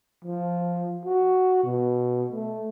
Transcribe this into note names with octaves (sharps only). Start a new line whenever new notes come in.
F3
F#4
B2
A3